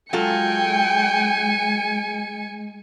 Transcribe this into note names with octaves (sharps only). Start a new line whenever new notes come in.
F#3 G#3 F4 A4 G5 G#5 C#7